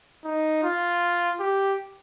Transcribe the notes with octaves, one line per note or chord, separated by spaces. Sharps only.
D#4
F4
G4